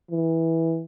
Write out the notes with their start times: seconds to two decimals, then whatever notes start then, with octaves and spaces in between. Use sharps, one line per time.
0.11 E3